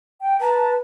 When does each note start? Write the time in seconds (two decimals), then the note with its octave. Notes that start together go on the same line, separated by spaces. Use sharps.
0.21 G5
0.41 B4 A5 A#5